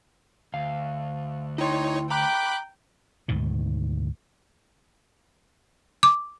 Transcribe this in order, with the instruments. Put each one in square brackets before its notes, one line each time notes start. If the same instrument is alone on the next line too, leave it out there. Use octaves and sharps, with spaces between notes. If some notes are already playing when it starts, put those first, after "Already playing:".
[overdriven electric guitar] D2 [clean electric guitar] F5
[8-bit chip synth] D#4 C#5 [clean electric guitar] E4 G5 C6
[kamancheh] G5 [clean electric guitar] A#5 [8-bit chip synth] B5 D6 F#6
[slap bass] D2 G#2 B2 D#3
[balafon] D6